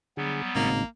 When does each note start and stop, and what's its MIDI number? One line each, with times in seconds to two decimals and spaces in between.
0.17 0.42 50
0.17 0.68 54
0.17 0.68 55
0.17 0.68 59
0.17 0.42 68
0.55 0.81 32
0.55 0.84 45
0.55 0.84 49
0.55 0.85 58
0.55 0.84 63